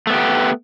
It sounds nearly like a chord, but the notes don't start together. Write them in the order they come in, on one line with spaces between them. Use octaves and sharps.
A3 B3 G4